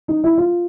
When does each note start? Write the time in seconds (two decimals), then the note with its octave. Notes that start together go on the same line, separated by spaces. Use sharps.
0.08 D#4
0.24 E4
0.38 F4